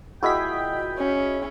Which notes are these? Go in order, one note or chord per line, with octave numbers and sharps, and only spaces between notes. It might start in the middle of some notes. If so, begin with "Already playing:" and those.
A#2 G#3 E4 F#4 G#4 D#5 G5 B6
C#4